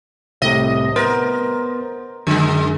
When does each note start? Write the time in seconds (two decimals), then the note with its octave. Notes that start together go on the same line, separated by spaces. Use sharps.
0.42 C2 A2 C3 D#5
0.96 B3 A#4 C5 A6
2.27 F#2 D3 G#3